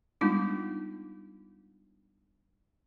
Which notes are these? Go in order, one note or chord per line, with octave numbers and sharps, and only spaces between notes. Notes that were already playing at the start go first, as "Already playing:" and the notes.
G3 G#3 B3 D4 D#4 F4